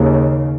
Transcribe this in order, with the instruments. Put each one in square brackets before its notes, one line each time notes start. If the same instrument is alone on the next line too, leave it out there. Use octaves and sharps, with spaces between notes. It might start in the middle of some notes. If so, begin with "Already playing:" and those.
Already playing: [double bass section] D#2 C#3